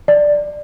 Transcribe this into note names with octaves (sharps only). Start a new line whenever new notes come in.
D5